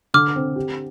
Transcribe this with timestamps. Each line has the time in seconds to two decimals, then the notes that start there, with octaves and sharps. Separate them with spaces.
0.14 D3 D6 F6
0.36 C4
0.56 G4